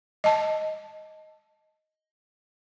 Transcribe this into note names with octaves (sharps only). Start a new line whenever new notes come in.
D#5 A5